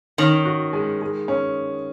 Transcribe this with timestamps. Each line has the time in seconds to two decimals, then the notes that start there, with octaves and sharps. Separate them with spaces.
0.18 D#3 C#4
0.45 F#4
0.73 G#3
1.01 G#3
1.28 C#4